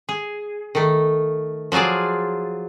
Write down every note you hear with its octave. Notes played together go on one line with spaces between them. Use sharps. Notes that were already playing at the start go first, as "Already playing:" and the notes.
G#4
D#3 A3
F3 F#3 F4 G#4 D5